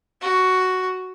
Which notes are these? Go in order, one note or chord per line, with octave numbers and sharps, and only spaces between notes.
F#4